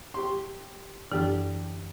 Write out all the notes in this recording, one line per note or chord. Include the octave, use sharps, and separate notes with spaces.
G4 C6
F#2 D3 E3 G4